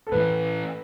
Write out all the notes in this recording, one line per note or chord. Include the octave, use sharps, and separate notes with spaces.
A4
A2 E3 A3 B4